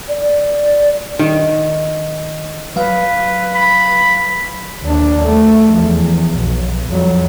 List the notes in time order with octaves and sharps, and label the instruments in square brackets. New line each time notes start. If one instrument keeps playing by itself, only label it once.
[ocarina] D5
[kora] D#3
[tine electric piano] F#3 F5 [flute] B4
[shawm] B5
[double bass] D#2 D4
A3
E2 F3
B1
F2 F#3